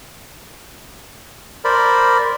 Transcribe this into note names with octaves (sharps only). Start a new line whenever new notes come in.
A#4 C5 D5 B5